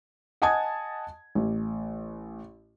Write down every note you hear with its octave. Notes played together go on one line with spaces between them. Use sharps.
D#5 F#5 G#5 A5 D#6 G#6
A1